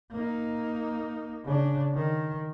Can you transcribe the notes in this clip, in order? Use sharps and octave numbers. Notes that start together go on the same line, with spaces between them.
A#3 D#4
C#3 D4
D#3